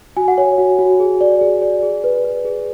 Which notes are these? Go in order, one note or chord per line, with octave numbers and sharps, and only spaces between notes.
F#4 G#5
F#5
C#5 G#5
F#4
F#4
G#4
D5
G#4
D5
G#4
B4
B4
G#4